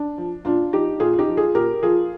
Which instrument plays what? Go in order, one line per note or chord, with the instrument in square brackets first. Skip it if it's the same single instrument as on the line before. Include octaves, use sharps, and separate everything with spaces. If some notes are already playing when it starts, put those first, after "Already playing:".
Already playing: [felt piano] D4
F3
A#2 D4 F4
F3 D#4 G4
A#2 F4 G#4
F4
D#4 G4
F3
F4 G#4
A#2 G4 A#4
F3 F4 G#4